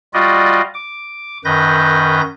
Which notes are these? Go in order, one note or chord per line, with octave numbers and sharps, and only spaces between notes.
G3 F4 F#4 D5 D#5
D6
F#2 D#3 B4 G6 A#6